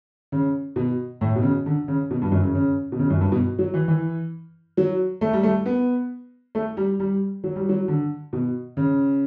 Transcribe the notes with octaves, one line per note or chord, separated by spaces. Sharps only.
C#3
B2
A2
B2
C#3
D3
C#3
B2
G2
F#2
C#3
C#3
B2
C#3
F#2
G2
B2
F#3
E3
E3
F#3
A3
G3
A3
B3
A3
G3
G3
F#3
G3
F#3
D3
B2
C#3